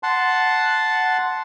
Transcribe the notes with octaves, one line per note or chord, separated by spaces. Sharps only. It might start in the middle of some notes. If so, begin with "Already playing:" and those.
F#5 A5 C6